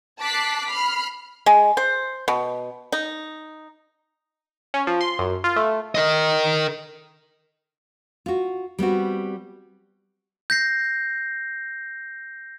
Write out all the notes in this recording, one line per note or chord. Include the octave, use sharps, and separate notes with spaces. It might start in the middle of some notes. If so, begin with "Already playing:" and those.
A5 D6 F#6 B6 C7
B5 F6 C7
G#3
C5
B2
D#4
C#4
F3
C6
F#2
F4
A3
A#4 D#5
F4 F#4
G3 B3 C4 F#4
G6 A#6 C7